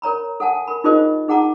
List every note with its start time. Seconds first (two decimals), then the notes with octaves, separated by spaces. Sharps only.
0.02 A#4 C#5 A#5 B5
0.40 A4 F#5 G#5 A5
0.67 A#4 B5
0.84 D#4 F4 G#4 A#4 C5 D#5
1.28 D#4 G#4 F#5 A5 A#5 D6